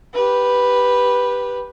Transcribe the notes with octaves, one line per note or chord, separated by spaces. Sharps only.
G4 B4